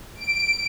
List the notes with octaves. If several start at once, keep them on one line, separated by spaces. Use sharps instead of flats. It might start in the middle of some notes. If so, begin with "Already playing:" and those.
D7